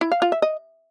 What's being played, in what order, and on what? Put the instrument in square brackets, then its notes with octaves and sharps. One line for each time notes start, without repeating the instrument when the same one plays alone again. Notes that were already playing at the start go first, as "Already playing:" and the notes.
[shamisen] E4
F5
F4
E5
D#5